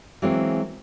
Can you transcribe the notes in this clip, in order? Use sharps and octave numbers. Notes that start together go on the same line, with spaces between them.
E3 F#3 G#3 A#3 C4